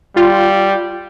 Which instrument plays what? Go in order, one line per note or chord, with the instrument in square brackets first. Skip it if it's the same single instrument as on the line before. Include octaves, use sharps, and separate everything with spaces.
[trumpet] G3 [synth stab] F4